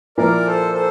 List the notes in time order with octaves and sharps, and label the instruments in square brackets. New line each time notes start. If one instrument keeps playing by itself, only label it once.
[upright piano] A#2 F3 A#3 E4 [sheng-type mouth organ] A#4 D5
[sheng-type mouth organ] A4 C5
A4 C5